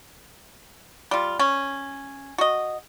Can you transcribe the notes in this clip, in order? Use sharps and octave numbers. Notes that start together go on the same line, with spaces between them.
G3 F4
C#4
F#4 D#5